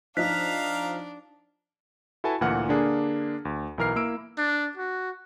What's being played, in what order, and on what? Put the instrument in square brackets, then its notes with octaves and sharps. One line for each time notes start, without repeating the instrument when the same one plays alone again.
[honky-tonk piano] F3 D#4 [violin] D4 [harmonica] F5 A#5 [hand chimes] F#6 B6
[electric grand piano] E4 F#4 A4 B4 G#5 A5
D2 A#2 E3 F#5 F6 C#7
D3 A#3 D4 G#4
D2
B1 E3 A#4 F6 C7
A#3 E4 E6 D7
[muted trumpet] D4
F#4